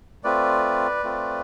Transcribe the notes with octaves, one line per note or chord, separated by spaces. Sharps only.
A3 C4 F4 B4 D5
A3 C4 F4